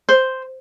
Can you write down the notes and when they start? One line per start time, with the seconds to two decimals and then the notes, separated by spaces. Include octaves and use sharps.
0.09 C5